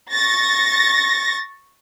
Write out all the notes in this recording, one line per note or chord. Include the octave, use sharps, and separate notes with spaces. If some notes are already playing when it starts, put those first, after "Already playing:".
C#6 A6 A#6